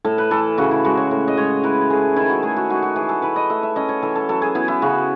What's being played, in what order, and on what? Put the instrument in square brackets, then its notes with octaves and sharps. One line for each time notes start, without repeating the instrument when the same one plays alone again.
[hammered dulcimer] A2 A4
B4
E3 A4
C#3 F#4
E4
G#3 F#4
C#5
A2
D#5
G#3 C#5
E4 B4
A3 G#4
D#3 E4
F#4
A3 G#4
F#4
D#4 F#4
F#4
E3 G#4
A4
E4 B4
D#5
A3 E5
E5
C#4 D#5
C#5
E3 A4
A4
F#3 A4
G#4
B3 E4
E4
C#3 F#4